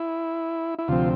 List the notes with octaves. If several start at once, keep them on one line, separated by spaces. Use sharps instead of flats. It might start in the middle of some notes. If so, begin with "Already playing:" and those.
Already playing: E4
E4
D2 C3 F3 C4 F4